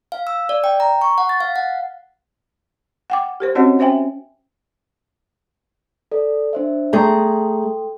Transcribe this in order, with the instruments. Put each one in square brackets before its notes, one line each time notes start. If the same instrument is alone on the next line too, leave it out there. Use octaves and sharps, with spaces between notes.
[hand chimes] F5
E6
D5
G5
A#5
C#6
F#5
A6
F5
F#5
[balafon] F#5 G5 D6
G4 A#4 C5
C4 C#4 F#4 C#5 D#5 F#5
C#4 C5 E5 G5 G#5
[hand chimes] A4 D5
D4 C5 E5
[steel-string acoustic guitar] A3 G#4 A#5 [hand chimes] A4 G5 C6